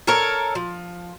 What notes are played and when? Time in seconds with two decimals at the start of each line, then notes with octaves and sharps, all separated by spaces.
0.07 A4 A#4 C#5
0.55 F3